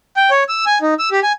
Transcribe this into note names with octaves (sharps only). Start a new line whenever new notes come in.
G5
C#5
E6
G#5
D#4
E6
G4
G#5